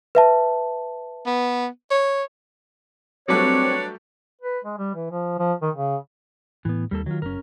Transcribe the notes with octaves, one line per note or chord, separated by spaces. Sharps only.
B4 E5 A5
B3
C#5
F#3 G3 A3 C4 D4 B4 C#5 D5
B4
G#3
G3
E3
F3
F3
D#3
C#3
A2 E3 B3
D#2 G3 A#3 A4
D#3 F#3 F4
F#1 C#4 A#4